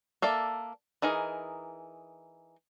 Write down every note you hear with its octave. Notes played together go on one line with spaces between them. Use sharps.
A#3 A4 D5 E5
E3 D#4 G#4 A#4